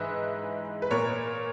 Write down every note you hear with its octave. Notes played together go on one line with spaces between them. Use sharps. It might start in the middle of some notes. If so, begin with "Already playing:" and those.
Already playing: G#2 E3 B4 D#5 E5
B4
A#2 A#4 C#5